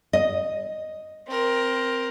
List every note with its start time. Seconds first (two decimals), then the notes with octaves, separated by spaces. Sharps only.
0.13 D#5
1.27 C4 A#4